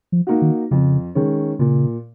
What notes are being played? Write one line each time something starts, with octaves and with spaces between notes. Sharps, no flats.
F3
A#3 D#4 F#4
D#3
F2 C#3
D#3 G#3 C#4
A#2 C#3